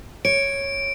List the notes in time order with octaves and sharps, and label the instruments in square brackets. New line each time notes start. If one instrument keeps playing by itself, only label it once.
[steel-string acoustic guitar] C#5 [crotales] D7